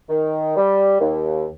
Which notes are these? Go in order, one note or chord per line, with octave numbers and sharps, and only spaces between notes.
D#3
G3
D#2